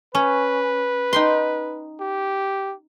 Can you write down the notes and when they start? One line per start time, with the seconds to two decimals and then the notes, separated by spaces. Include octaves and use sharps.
0.15 C#4 B4
1.13 D#4 G5 C6
2.00 G4